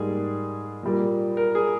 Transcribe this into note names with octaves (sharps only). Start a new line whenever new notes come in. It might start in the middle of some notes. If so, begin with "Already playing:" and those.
Already playing: G#2 G3 A#3 G#4
A#2 G3 A#3
A#4
G#4